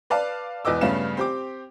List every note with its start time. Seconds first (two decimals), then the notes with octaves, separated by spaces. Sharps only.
0.10 B4 D5 F5 A5
0.65 E1 E2 B4 D#5 D6 E6
0.81 G2 C#3 A3 B3 F5 E7
1.17 C4 G4 D6